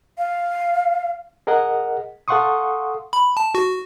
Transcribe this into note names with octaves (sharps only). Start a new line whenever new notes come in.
F5
G#4 A#4 D#5 F#5
A4 F5 F#5 C6 C#6 D#6
B5
A5
F#4